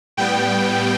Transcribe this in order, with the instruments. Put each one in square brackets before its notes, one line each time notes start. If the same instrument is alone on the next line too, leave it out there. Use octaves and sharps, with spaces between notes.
[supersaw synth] A2 G3 B3 G5